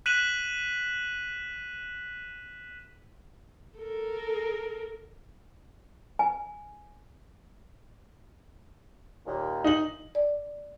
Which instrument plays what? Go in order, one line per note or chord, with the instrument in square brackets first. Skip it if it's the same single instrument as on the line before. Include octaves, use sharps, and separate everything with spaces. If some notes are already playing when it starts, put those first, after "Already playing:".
[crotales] F#6 B6 D#7 E7 F#7
[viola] A4 A#4
[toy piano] G#5
[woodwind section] D#2 A#2 D#3
[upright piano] D#4 F#7
[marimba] D5